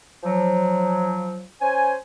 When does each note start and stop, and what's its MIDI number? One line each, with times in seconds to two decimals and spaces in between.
0.24 1.43 53
0.24 1.43 54
1.60 1.94 61
1.60 1.94 72
1.60 1.94 80